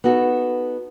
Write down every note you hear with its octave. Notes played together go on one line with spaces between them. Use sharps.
B3 D#4 F#4 A4